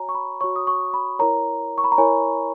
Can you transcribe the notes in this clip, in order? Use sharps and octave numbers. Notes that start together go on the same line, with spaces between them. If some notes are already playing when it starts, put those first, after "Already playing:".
Already playing: F#4 C#5 G#5 A#5
C#6
B5
F#4 C#5 C#6
D#6
C#6
B5
E4 A#4 C#5 A#5
C#6
B5
A#5
E4 A#4 C#5 G#5